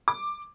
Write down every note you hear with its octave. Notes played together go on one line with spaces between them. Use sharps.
D6